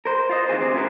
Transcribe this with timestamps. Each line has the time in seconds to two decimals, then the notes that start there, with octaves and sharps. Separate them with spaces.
0.05 A#4 C5
0.29 F4 C5 D#5
0.48 D#3 E3 C4 G#4 C5
0.60 D2 C3 C5
0.74 C#4 E4 F4 G4 A#4 B4